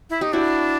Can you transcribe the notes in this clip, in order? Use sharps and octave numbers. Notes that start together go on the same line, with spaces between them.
E4
D#4 G4
D4 E4 F#4